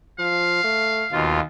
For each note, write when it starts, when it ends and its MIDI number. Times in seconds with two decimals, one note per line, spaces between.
0.19 0.61 53
0.19 1.28 77
0.64 1.04 57
1.12 1.40 39
1.12 1.40 47
1.12 1.40 65